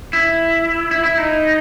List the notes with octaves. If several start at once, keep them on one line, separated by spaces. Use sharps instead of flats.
E4
E4
E4
D#4